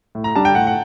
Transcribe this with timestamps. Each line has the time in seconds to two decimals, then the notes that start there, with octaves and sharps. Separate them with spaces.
0.15 A2
0.24 A#5
0.35 G3 D4 A5
0.45 G5
0.55 A2 F#5
0.67 F#5